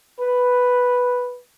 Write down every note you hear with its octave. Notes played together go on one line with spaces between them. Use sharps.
B4